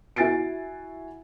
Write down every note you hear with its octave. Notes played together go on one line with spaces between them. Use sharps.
E4 F#4 G#5 A6 C7 D7